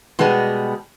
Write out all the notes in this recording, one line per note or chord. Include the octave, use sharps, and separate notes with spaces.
B2 G3 G#3 B3